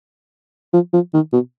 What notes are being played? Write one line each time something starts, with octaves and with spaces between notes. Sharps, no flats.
F3
F3
D#3
B2